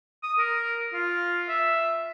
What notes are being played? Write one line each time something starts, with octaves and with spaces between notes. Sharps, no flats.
D#6
A#4
F4
E5